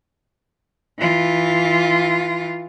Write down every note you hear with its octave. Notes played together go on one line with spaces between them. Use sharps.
E3 F4